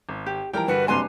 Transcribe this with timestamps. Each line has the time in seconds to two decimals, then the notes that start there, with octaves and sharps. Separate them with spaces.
0.09 G#1
0.26 G4
0.53 E3 F3 G3 G4 A#4 G5 A#5
0.68 G2 D3 F#4 B4 C#7
0.88 F#1 C3 G3 D4 B4 G#5 C6